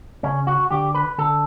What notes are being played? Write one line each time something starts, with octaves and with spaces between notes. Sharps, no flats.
C#3 C#4
F#4
D3 G4
B4
D3 A4